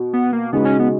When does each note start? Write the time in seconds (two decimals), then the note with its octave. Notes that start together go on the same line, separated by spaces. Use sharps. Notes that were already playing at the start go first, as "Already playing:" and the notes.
Already playing: B2
0.13 B3
0.33 A#3
0.53 C#3 G#3 B3 D#4 F#4
0.65 C#4
0.79 B3